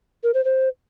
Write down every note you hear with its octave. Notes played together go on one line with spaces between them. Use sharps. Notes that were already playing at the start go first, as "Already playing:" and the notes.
A#4
C5
C5